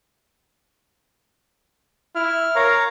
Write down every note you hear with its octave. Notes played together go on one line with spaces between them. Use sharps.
E4 F6
A#4 C#5 F5 A#5